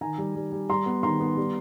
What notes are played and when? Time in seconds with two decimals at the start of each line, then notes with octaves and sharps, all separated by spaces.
0.01 D#3 G#5 A#5
0.18 G3
0.35 G3
0.52 G3
0.69 G3 A#5 C6
0.86 B3
1.03 D#3 A#5 C6
1.20 B3
1.37 G3